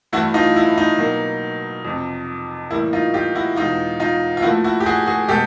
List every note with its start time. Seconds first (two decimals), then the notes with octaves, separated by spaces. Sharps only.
0.12 G2 E3 A3 E4 F#4
0.34 D#4 F4
0.56 E4
0.78 D#4
0.98 B2 F#3 A#3
1.85 F2 C3 F3
2.70 A2 E3 G3 A#3 E4
2.93 D#4 F4
3.14 F4 G4
3.35 E4 F#4
3.56 E2 B2 G#3 D#4 F4
4.00 D#4 F4
4.37 F4
4.42 A#2 F3 A3 E4 F#4
4.64 E4 F#4
4.80 G4
4.86 F#4 G#4
5.07 F#4 G#4
5.28 B2 G#3 G4 A4